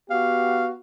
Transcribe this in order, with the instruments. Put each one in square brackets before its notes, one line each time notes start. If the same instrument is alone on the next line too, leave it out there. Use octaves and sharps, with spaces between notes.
[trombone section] B3 F#4 G4 [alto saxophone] F5